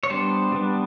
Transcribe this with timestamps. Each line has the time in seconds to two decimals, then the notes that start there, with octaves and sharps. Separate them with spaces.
0.03 C#5
0.10 G3 B3 D4 C5
0.52 G3 B3 D4